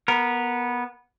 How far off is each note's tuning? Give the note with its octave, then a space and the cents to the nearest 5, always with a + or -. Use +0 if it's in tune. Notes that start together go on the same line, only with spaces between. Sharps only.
B3 -15 A#4 +0